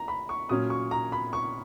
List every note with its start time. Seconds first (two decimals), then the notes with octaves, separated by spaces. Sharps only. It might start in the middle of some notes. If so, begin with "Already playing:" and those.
Already playing: A#5
0.08 B5
0.29 C#6
0.49 A#2 F#3 C#4 D#6
0.70 C#6
0.91 A#5
1.12 B5
1.33 C#6